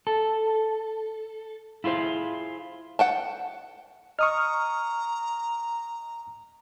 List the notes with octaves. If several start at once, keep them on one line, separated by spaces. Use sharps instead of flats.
A4
E4 F4 G#4 C5
F#5 G5 A5
D#5 A#5 C#6 D#6 F6